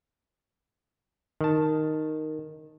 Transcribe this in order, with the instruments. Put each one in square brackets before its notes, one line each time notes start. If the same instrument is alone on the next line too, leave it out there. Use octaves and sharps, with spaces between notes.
[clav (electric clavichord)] D#3 A5